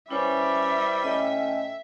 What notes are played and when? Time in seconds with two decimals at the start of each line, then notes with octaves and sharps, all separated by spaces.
0.11 G3 C#4 E4 B4 C5 E5
1.04 A2 C#4 D#5 G5